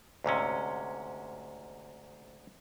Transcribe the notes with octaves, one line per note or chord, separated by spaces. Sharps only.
D2 G#2 C3 C#4